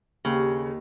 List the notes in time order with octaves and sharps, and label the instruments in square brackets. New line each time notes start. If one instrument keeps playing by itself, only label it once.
[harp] D#2 [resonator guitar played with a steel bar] C#3 [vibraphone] G4